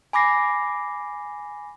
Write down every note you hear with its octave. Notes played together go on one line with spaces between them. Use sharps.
G#5 B5 D6 A#6 C7